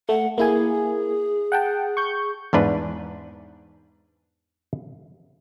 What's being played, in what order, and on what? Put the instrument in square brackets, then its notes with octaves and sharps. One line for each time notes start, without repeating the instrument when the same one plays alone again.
[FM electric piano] A3 [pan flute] F#5
[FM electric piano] A#3 E4 G#5 [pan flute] G#4
[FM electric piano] F#5 G5 A5
C#6 G6
[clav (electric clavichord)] E2 G#2 D4 B4